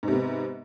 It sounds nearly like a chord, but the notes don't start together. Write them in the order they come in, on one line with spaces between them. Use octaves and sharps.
G#2 C3 B3